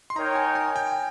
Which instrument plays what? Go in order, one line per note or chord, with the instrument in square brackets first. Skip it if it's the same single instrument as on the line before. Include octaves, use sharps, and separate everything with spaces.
[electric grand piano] C6
[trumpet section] D#4 A#4 C#5 G5 [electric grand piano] A#5
[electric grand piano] G#5
G#5
G5